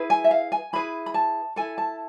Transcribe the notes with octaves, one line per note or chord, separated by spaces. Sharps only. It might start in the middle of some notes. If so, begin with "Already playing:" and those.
Already playing: E4 G#4 B4
G#5
E5
F5
G#5
E4 G#4 B4 B5
B5
A5
E4 A4 G#5
A5